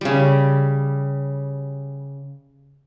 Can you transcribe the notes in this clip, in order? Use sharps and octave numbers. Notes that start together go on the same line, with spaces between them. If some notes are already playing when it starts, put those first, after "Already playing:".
C#3 G3